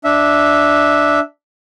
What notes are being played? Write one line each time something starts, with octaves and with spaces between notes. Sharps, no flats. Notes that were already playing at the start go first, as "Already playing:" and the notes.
D4 E5